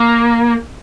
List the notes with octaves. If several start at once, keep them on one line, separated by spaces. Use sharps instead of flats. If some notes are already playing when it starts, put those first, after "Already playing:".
Already playing: A#3